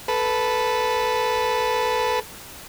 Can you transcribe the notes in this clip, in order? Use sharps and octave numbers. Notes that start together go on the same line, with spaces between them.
A4 B4